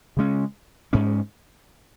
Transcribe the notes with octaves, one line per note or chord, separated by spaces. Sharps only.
C#3 G#3 C#4
G#2 G#3 C#4